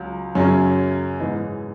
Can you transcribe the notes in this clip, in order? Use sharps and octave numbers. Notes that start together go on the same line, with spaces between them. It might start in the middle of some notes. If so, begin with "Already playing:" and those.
Already playing: C#2 F#3
F#2 C#3 F#3 C#4
G#2 E3 D#4